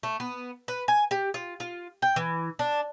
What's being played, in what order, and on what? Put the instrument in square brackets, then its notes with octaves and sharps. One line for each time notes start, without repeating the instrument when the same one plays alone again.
[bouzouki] A3
B3
B4
G#5
G4
F4
F4
G5
E3
D4